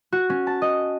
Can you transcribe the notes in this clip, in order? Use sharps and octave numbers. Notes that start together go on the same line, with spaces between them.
F#4
C#4
A5
D#5